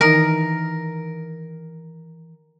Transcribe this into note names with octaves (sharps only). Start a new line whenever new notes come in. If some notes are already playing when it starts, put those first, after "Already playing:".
D#3 E3 D#4 A#4